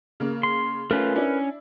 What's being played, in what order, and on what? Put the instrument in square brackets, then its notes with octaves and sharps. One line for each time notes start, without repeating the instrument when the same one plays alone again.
[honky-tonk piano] C#3 A#3
[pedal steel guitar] C6
[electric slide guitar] A3 C#4 F4 [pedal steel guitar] A#4 B4
[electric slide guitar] C#4 [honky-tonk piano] D4 E4